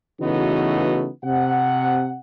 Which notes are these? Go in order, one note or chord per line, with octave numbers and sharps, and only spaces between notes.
C#3 E3 A3 B3 D#4 F#4
C3 F#5